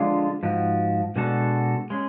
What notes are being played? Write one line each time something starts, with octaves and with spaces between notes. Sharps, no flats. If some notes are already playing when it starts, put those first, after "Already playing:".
Already playing: D3 F3 G#3 D4 F4
G#2 F3 F#4
B2 G#3 D4 F#4 A4
G#3 C#4 G#4